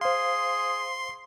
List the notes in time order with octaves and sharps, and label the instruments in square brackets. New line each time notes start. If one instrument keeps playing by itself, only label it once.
[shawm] G#4 [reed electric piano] C5 F5 [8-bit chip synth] C6